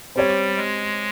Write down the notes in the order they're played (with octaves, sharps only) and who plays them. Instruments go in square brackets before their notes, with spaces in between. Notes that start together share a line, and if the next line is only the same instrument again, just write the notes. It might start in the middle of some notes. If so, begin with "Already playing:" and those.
[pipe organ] G3 [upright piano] C4 G4 C#5
[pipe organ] G#3